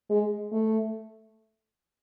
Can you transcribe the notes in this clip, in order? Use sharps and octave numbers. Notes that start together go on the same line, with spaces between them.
G#3
A3